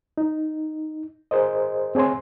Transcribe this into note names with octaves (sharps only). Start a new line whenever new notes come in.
D#4
G#4 A#4 C5 D#5
C4 G#4 C#5 G#5 C6